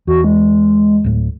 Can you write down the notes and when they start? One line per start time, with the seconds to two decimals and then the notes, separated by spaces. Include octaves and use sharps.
0.07 E2 F#4
0.24 G#3
1.04 D1 A2